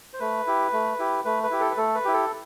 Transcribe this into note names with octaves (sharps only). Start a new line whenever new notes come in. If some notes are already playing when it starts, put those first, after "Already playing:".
C5
A3 B4
E4 G4
A3
E4 G4
A3 B4
B4
E4 G4
A4
B4
A3 A4
B4
E4 G4
A4